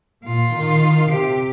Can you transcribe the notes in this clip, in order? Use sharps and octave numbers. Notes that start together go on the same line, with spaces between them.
A#2 F4
D#3
C3 G4